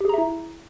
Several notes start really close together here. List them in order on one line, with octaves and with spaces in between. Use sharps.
G4 G#4 A#5 E5 E4